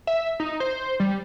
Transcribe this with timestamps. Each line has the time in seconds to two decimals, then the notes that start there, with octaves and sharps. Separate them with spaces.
0.07 E5
0.40 D#4
0.60 C5
1.00 G3